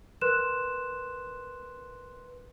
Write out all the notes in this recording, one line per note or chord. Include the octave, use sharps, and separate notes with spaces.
A#4 B4 C6 F#6 E7